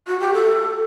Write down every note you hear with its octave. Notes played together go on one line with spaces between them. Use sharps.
F#4
G4
A4